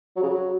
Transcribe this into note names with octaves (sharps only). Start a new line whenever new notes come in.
F#3
C#3
F#3